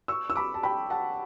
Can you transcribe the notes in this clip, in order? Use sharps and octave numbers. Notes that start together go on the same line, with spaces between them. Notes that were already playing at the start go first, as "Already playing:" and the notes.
C#6 E6
E6
B5 D6
A5
G5 B5
F#5 A5